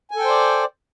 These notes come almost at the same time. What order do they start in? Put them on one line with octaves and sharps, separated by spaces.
G#5 A4 G5 C5 D5